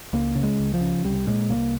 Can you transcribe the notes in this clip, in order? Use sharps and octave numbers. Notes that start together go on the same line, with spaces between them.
C#2 A#3
C#3
G#3
C#2
F3
C#3
C2 G3
A#2 G#3
C2 A#3